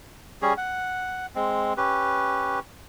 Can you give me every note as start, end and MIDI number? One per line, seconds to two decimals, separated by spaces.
0.42 0.53 55
0.42 0.53 61
0.42 0.53 68
0.57 1.26 78
1.35 1.73 56
1.35 1.73 60
1.77 2.59 61
1.77 2.59 67
1.77 2.59 71